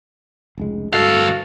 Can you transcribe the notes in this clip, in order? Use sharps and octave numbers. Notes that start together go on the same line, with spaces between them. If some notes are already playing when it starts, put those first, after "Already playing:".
F1 C#2 G#3
D2 G2 A3 F#4 A4 F5